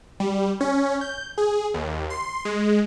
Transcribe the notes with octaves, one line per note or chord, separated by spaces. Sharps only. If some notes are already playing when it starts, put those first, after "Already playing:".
G3
C#4
G6
G#4
D#2
C6
G#3